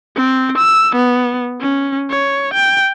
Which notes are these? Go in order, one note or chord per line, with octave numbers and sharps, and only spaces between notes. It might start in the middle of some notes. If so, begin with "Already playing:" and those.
C4
E6
B3
C#4
C#5
G5